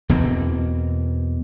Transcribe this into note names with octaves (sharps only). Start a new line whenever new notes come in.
E2 B2 A#3 C4